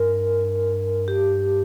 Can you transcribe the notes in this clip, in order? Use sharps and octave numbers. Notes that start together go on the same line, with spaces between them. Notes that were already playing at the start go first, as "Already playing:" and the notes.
Already playing: G2 A#4
G4